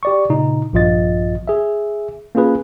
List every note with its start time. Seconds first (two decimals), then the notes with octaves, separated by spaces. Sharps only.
0.03 G4 D5 C#6
0.29 A#2 C#3 D#4
0.73 A#1 G2 F3 F4 D#5 A6
1.48 G#4 E5
2.35 A#3 C#4 F4 G#4 B4